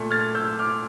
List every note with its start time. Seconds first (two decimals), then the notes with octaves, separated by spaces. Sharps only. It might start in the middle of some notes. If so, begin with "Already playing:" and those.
Already playing: A#2 A3
0.11 F6 A6
0.35 E6 G6
0.59 D6 F6